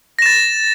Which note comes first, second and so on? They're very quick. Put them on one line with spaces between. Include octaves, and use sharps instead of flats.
A#6 E7 A6